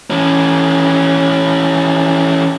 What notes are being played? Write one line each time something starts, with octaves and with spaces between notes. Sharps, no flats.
E3 C#4